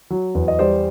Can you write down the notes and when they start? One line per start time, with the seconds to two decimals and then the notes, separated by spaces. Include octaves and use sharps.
0.10 F#3
0.35 E2
0.48 D#5
0.59 G3 C5 D5